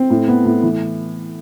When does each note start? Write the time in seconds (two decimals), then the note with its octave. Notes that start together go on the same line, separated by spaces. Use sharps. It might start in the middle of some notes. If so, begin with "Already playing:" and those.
Already playing: C4
0.10 A2
0.28 B3
0.45 A2
0.63 E3